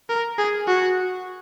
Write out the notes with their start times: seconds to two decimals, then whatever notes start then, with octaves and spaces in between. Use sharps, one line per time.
0.09 A#4
0.38 G#4
0.67 F#4